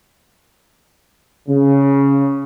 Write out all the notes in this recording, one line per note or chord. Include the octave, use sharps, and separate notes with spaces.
C#3